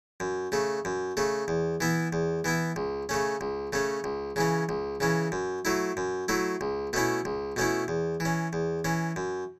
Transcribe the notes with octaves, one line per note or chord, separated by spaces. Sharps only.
F#2
C#3 A3
F#2
C#3 A3
E2
E3 B3 E4
E2
E3 B3 E4
C#2
C#3 A3 C#4
C#2
C#3 A3 C#4
C#2
C#3 E3 C#4
C#2
C#3 E3 C#4
F#2
F#3 A3 E4
F#2
F#3 A3 E4
C#2
B2 A3 C#4 E4
C#2
B2 A3 C#4 E4
E2
E3
C#4
E2
E3 C#4
F#2